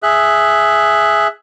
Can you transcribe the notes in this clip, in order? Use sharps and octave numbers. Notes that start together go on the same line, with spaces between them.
G#4 E5 F#6